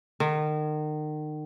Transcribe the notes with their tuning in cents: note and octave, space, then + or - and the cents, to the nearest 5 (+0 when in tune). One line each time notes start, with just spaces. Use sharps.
D#3 -35